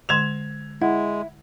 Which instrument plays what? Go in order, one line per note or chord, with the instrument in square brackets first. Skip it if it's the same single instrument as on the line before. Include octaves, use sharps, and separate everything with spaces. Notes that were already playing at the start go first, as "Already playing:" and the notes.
[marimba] D3 G#3 C6 [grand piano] G#6 E7 F7
[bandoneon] G#3 [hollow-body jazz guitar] E4 [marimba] F#5